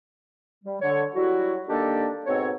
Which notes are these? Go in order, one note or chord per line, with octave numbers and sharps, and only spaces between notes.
G3
D3 C#5
F#3 G3 E4 F#4
D#3 G3 A#3 D4 G4 A4
G#2 B2 C4 A4 C#5